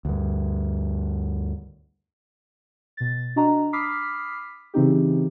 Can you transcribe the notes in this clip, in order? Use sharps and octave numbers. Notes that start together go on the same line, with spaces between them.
D2 G2
B2 A6
D4 F#4 D#5 A#5
B5 D6 D#6 F6 B6 C7
C#3 E3 C4 D#4 G4